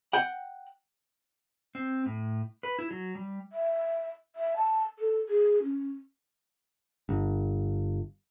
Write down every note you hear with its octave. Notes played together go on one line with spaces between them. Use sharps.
F#5 G5
C4
A2
B4
E4
F#3
G3
E5
E5
A5
A4
G#4
C#4
G1